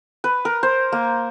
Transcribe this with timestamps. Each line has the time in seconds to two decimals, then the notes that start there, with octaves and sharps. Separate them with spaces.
0.24 B4
0.45 A#4
0.63 C5
0.92 A#3